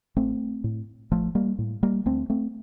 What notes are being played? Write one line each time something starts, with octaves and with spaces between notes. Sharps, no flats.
A1 A3 C4
A2
A1 F3 A3
G3 A#3
A2
G3 A#3
D2 A3 C4
A3 C4